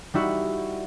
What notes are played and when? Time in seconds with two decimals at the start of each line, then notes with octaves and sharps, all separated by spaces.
0.14 G3 D#4 E4 F#4